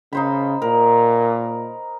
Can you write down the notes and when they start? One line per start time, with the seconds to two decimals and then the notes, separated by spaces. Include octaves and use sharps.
0.13 C#3 D#4 C5 B5
0.62 A#2 A#4